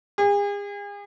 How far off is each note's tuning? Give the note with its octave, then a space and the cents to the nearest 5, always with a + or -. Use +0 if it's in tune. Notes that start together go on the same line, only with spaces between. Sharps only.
G#4 -40